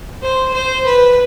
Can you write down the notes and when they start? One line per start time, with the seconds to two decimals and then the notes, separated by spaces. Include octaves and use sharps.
0.22 C5
0.54 C5
0.86 B4